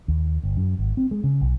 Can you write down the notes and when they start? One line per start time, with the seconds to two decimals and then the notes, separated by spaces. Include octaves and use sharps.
0.08 D#2
0.43 G1
0.57 F#2
0.79 G#1
0.97 C4
1.11 G#3
1.24 C#3
1.41 B1